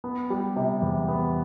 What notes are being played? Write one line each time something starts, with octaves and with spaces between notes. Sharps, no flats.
B3
G3
C3
E2
B3